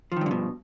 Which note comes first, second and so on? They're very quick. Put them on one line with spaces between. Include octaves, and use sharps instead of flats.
F3 D#3 G2 D3 B2